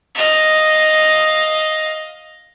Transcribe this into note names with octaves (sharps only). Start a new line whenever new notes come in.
D#5 F5